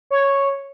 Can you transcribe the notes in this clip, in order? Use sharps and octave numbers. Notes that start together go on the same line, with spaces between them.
C#5